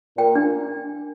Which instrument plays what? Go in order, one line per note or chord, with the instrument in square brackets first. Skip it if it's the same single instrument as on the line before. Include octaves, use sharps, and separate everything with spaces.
[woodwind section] A#2 [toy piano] G5
[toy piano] D4